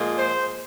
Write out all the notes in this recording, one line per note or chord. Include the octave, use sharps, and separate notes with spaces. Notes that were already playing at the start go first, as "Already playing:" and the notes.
Already playing: A#2 F3 G#3
C5